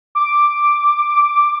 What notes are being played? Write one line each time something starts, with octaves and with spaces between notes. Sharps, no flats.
D6